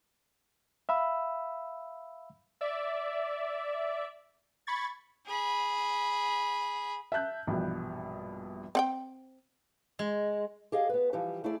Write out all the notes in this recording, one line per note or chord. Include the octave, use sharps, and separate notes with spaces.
E5 F5 B5 E6
D5 E5
B5 C#6 G#6 A6
G#4 B5
E5 A5 F#6 G6
A#1 G2 B2 E3 G3
C4 F#5 G5
G#3
G4 G#4 D#5 F5
B3 B4
E3 F3 G3 G4
A3 E4 G#4 D5